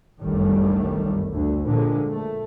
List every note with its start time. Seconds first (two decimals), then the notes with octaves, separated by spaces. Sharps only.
0.20 G1 C2 F#2 D#3 G3 A3
1.32 D2
1.66 A#2 D3 F3 G#3
2.09 A3